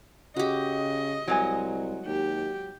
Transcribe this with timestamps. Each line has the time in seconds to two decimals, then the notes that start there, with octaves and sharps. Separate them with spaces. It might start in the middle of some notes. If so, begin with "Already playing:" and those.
0.36 C#3 F#4 G4 D#5
1.28 C2 F#3 G#3 G#5
2.06 D#2 G4